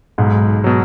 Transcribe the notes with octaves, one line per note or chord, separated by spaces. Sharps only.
B1 G#2
B2 F#3